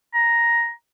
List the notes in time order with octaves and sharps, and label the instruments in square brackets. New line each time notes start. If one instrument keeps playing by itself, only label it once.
[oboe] A#5